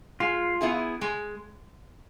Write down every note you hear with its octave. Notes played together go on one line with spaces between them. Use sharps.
G#3 F4
B3 E4 G#4
G#3